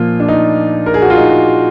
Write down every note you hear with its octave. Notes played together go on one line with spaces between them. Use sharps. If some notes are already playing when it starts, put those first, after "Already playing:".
Already playing: A#2 F3 A#3 F4
D4
D#4
A#4
G#4
F#4
F4
D#4